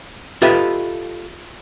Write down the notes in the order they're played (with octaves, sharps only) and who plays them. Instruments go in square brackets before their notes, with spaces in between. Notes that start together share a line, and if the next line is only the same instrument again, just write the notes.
[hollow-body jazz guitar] F4 G4 A4 B4 D#5 E5